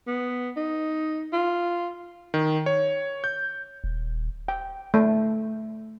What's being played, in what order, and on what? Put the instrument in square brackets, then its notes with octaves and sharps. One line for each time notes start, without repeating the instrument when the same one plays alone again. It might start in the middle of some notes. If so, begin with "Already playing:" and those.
[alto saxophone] B3
D#4
F4
[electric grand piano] D#3
C#5
G6
[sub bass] D#1
[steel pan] G5
A3